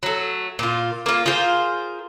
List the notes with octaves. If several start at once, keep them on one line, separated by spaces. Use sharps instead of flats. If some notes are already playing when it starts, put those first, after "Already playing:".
F#3 A3
A#2 F4
A#3 F4
F4 G#4 A#4 C5